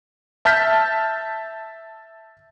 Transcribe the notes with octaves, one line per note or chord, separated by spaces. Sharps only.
E5 A5 F6 G6 B6